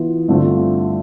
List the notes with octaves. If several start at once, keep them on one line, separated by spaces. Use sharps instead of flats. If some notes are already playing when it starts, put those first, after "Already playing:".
Already playing: E3 B3 F4
G2 D3 A3 C4 F4